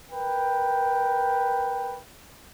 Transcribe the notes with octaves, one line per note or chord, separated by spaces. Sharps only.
A#4 B4 G5